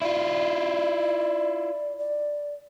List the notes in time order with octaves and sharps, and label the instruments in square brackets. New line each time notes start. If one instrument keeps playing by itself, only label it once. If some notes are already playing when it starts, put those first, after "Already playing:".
[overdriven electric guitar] E4 F4 [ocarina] D5
[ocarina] D5